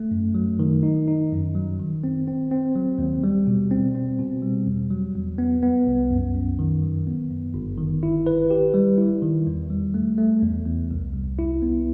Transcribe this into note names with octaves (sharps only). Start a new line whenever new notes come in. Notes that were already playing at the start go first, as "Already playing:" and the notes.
Already playing: A3
F#2
F#3
D#3
D#4
D#4
F#2
F#3
D#3
C4
C4
C4
F#3
D#2
G3
B2
C4
C4
B2
G3
E2
F#3
E2
B3
B3
C2
F#2
F#2
D#3
F#3
B3
F#2
G1
D#3
E4
B4
G4
G3
E4
D#3
E2
G3
A3
A3
E2
E2
C2
C2
E4
B3